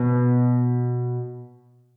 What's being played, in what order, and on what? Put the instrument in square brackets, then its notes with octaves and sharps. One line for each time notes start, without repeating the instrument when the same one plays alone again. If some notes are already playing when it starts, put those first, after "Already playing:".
Already playing: [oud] B2 B3